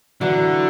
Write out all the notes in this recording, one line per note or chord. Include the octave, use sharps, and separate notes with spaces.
D3 E3 F#3